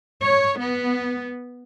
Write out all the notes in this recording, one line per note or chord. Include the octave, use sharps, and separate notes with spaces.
C#5
B3